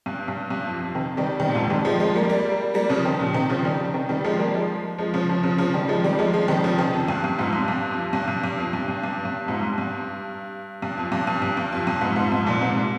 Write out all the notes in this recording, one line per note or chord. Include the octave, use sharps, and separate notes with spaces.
G2
G2
G2
F2
F2
C3 D#3
D#3 G3
D#3 G3
A#2
F2 G#2
D#3 G3
F3 G#3
F3 G#3
G3 A#3
G3 A#3
G3 A#3
C#3 F3
C3 D#3
A#2 C#3
C3 D#3
C#3 F3
D#3 G3
C3 D#3
D#3 G3
F3 G#3
G3 A#3
F3 G#3
F3 G#3
C#3 F3
C#3 F3
C#3 F3
C#3 F3
D#3 G3
F3 G#3
D#3 G3
F3 G#3
F3 G#3
D#3 G3
C#3 F3
C3 D#3
F2
G2
G2
F2 G#2
G2
G2
F2
G2
G2
G2
F2
G2
G2
G2
G2
F2 G#2
G2
G2
G2
F2
G2
G2
G2
G2
F2
G2
F2 G#2
F2 G#2
F2 G#2
G2 A#2
G#2 C3
A#2